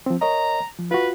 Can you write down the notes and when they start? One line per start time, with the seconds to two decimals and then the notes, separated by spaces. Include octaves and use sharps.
0.06 F3 C4
0.21 A#4 C#5 D#5 A#5
0.79 F3
0.91 F4 F#4 B4